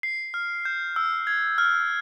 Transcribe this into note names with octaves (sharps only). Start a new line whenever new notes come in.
C7
F6
G6
E6
G#6
F6